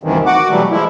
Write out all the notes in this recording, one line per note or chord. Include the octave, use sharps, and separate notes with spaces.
D2 G2 C3 D#3 E3
F#4 F#5 D6
B2 E3 F#3 G3 A3
E3 F3 G#3 E4